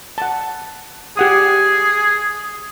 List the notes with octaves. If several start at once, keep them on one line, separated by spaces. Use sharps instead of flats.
F#5 A5
G4 G#4 F#5 D#6